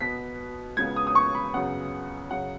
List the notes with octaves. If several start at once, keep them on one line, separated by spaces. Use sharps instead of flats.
B2 B3 B6
C#2 C#3 B3 G#6
D#6
D#6
C#6
B5
F#2 C#3 B3 F#5
F#2 C#3 F#3 F#5